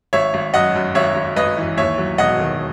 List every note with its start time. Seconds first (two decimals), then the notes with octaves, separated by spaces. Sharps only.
0.13 G#1 C#5 E5
0.34 G#1
0.54 F#2 D#5 F#5
0.75 F#2
0.95 G#1 C#5 E5
1.16 G#1
1.36 G#1 B4 D#5
1.57 E3
1.77 D#2 C#5 E5
1.98 F#3
2.18 E1 D#5 F#5
2.40 D#3